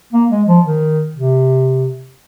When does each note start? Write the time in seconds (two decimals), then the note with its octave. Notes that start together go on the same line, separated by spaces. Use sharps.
0.13 A#3
0.31 G#3
0.48 F3
0.65 D#3
1.17 C3